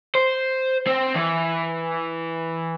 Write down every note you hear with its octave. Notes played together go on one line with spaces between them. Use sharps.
C5
C4
E3